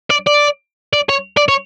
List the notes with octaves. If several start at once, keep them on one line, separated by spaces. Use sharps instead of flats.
D5
D5
D5
C#5
D5
C#5